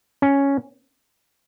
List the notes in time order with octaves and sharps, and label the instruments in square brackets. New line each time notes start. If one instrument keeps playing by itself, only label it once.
[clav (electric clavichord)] C#4